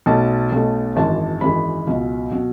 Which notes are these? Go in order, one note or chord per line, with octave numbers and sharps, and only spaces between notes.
B1 B2 A3 A5
B1 B2 A3
G#1 F#2 E3 G#3 A5
G#1 F#2 E3 G#3 B5
C#2 B2 F#3
B2 F#3